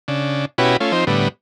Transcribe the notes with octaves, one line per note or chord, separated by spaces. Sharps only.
C#3 D4
B2 C#4 E4 F#4 G4 B4
A3 C#4 F4
F3 C4 D#4 C5
A2 D3 G3 B3